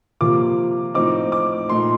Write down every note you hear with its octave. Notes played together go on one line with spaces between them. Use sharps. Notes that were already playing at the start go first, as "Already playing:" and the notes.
C3 F3 A#3 F4 D6
A2 F3 C4 D#4 D6
D6
A#2 A3 D#4 C6